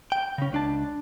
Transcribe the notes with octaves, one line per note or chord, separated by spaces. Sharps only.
G5
C#3 C#4
C#2 D4 A5